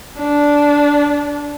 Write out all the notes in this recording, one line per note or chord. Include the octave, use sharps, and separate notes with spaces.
D4